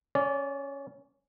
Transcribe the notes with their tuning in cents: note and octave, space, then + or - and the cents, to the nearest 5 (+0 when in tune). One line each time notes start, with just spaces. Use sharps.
C#4 +0 D5 -25